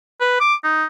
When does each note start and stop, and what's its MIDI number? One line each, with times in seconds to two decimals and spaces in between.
0.20 0.37 71
0.40 0.55 86
0.64 0.85 63